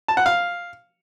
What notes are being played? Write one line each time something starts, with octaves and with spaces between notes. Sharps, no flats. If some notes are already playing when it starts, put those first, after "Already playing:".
A5
F#5
F5